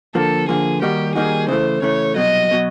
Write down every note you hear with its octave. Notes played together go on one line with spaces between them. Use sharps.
D3 F3 A#3 A4
D3 F3 A#3 G#4
D#3 G3 A#3 D#4 F#4 G4
D#3 G3 A#3 D#4 F#4 G#4
C#3 E3 A3 C5
C#3 E3 A3 C#5
C2 B2 F#3 D#5
B2 F#3